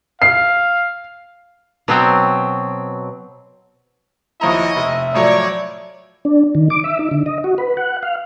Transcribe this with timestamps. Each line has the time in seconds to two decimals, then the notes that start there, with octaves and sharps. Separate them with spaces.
0.22 F5 C7
1.88 B2 F#3 C4
4.41 D#2 F3 E4 C#5 D#5 A#5
4.76 F1 E5
5.14 A2 F3 F#3 C#5 D5
6.25 D4
6.55 D#3
6.70 D6
6.84 E5
6.99 D#4
7.11 D3
7.26 D#5
7.44 F#4
7.58 B4
7.77 F#5
8.03 F5